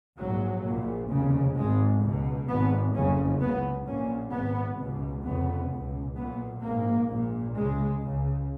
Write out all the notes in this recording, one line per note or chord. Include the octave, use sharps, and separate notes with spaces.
A#1 G#2 F#3
A#1 A#2
F1 D#2 C#3
G#1 G#2 G#3
C#2 B2
G#1 G#2 B3
F#1 F2 C#3 C#4
C#2 B3
C#3
A#1 A#2 C#4
G#1 G#2 B3
C#2 B2
F1 F2 C#3 B3
C#2 B2
B1 A#2 B3
A#1 G#2 A#3
A#1 A#2
C#2 C#3 G#3
C#2 C#3